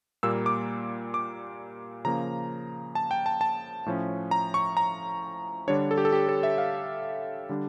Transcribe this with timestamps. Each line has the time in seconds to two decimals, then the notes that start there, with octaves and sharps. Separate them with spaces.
0.23 A#2 G3 A#3 E6
0.46 D6
1.14 D6
2.05 C#3 F3 A#3 A#5
2.95 A5
3.11 G5
3.26 A5
3.41 A5
3.86 A2 F3 C#4
4.31 A#5
4.54 C#6
4.77 A#5
5.68 D3 G3 D4 C#5
5.91 A4
5.98 G4
6.05 A4
6.13 G4
6.29 A4
6.43 E5
6.58 F5
7.49 D3 G3 D4